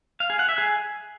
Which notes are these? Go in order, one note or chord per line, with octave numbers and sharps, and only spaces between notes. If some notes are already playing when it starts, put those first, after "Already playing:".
F5
G#4
F#5
E5
G#4